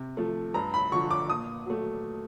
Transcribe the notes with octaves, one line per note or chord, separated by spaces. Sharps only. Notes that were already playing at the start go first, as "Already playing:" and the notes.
Already playing: C3
F3 A3
G2 A#5
B5
D3 F3 C#6
D6
A#2 D#6
F#3 A3